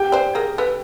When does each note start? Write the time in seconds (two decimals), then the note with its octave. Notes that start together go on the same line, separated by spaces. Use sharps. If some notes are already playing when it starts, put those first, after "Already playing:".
Already playing: G4 G5
0.12 C5 D5
0.35 G#4 A#4
0.58 A4 B4